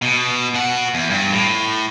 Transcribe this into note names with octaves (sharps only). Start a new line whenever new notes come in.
B2
B2 F#5
E2
G2
A2